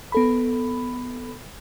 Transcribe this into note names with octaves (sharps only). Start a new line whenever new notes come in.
B3 A4 B5